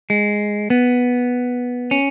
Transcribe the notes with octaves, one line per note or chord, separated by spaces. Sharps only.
G#3
B3
C#4